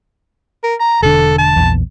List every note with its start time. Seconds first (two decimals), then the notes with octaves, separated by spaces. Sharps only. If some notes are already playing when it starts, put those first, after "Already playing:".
0.64 A#4
0.80 A#5
1.03 E1 D3 A4
1.38 A5
1.56 A#1 E2